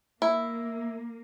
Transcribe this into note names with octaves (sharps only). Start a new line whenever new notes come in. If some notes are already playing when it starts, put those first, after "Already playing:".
A#3 E4